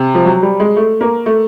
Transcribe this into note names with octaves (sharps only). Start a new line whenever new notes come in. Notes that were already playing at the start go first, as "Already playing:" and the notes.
Already playing: C3
F3
F#3
G3
G#3
A3
A#3
A3